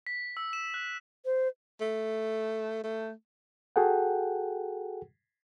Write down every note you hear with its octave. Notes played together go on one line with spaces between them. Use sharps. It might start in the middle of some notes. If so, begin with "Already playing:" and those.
B6
E6
E7
F#6
C5
A3
A3
F#4 G#4 A4 F#5 G5